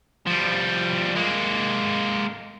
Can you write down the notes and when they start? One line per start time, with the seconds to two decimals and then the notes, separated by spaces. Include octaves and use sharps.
0.27 F3 G3
1.15 G#3 A#3